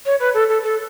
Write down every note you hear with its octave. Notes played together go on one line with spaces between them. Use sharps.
C#5
B4
A4
A4
A4